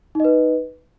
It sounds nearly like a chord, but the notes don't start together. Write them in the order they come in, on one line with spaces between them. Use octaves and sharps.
D#4 D#5 B4